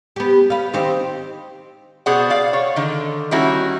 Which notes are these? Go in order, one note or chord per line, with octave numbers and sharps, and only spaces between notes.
B3 G4
B4 F5
D#3 C4 G4
B2 G#4 C5 D5 F#5
D5 F5
C#5
D3 D#3
D#3 G3 A#3 C#4 E4 F#4